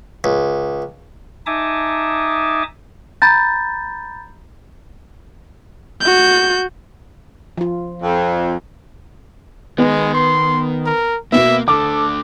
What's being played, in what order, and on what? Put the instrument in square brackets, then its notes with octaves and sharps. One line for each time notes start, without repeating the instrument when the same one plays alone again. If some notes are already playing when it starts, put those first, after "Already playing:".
[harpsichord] C#2
[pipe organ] D#4 E5 G#5 A5 D6 D#6
[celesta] A#5 B5 G6 A6
[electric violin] F#4 G6
[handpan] F3 F4
[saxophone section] F2
[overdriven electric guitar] D#3 [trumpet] G#3 [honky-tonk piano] B3
[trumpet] C6
A#4
[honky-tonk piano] B2 B3 [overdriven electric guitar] A#3 [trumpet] E5
[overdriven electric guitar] D2 D3 [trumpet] A4 [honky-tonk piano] D6